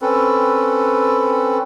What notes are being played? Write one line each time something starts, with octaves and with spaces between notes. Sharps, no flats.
C4 C#4 A4 B4